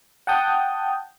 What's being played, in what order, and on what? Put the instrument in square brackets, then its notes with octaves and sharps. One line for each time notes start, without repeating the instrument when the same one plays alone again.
[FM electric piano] F#5 G5 A5 D#6 G6